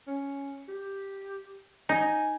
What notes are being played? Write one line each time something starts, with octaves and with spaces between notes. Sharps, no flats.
C#4
G4
D#4 G#5